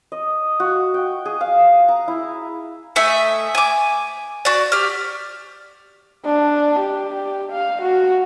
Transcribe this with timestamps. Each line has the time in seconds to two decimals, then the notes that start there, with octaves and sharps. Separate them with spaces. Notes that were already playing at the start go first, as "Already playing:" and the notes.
0.12 D#5
0.60 F#4
0.94 G5
1.25 G#4
1.41 F5
1.88 A#5
2.08 E4
2.96 A3 D#5 E5 G#5
3.55 G#5 D6
4.45 F#4 D5
4.72 G4 F6
6.25 D4
6.80 G4
7.52 F5
7.82 F#4